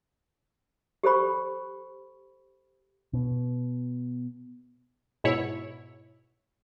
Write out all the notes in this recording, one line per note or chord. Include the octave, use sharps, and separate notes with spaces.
G4 A4 C5 B5 C#6
B2
G#2 B2 E4 C#5